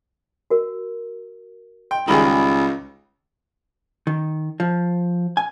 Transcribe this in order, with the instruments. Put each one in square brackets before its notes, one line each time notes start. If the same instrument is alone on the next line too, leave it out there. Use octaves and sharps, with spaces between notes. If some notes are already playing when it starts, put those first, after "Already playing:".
[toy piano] F#4 A#4
[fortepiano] G5 [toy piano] C6
[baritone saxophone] C#2 [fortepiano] D#3 G3 G#4 [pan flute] B5
[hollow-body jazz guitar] D#3
F3
G#5